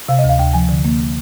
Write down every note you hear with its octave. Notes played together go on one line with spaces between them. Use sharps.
C3 F5
D#5
D2
F5
D2 G5
F3 G#5
D3
A#3